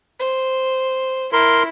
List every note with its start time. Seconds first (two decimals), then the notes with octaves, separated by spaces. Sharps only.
0.19 C5
1.33 E4 A#4 C6